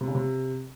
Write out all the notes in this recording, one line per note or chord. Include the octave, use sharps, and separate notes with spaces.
C3
C#3
C3